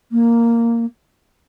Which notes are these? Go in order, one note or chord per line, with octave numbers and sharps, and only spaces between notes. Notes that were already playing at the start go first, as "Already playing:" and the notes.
A#3